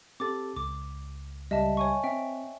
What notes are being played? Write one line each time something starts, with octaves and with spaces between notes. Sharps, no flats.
C4 G4 A4 D6 A6
C#2 D6
C#2 G3 D#5 E5 A5
C#5 G#5 C#6
C4 E5 G5